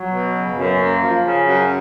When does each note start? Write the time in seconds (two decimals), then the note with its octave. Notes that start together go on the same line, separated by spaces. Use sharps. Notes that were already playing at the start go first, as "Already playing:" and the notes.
Already playing: F#3
0.10 B2
0.32 C#3
0.54 F#2
0.77 A#3
1.01 F3
1.23 C#3
1.45 F#2